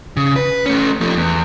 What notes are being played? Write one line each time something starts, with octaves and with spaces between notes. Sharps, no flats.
C#3
B4
A3 C#4
F3 A3
E2